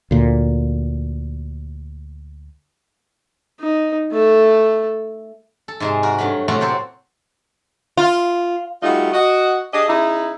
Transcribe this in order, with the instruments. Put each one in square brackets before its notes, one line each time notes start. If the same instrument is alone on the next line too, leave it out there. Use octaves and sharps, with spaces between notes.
[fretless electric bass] D2 A#2
[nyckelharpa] D#4
A3 A4
[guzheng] A4
G#2 C3 G#3
F#4 A#4
G2 F#3 A3 B5
A2 C3 F#3 A3 F4 F#4
A#3 C4 A4 C5 C#5
[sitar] F4
[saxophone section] G3 A3 D#4 F4 F#4
F#4 D#5
D4 G4 G#4 D#5
C#3 D#4 E4